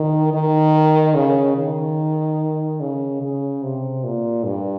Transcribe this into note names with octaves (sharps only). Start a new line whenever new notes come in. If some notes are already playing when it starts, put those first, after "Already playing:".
Already playing: D#3
D#3
C#3
D#3
C#3
C#3
C3
A#2
G2